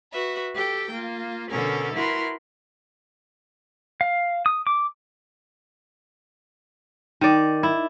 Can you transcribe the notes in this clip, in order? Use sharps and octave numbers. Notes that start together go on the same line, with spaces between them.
F#4 B4 E5
G4 A4 G5
A#3 F4
B2 D3 C#4 A4 A#4
E4 F#4 A#4 B4 C6
F5
D#6
D6
D#3 D5
E4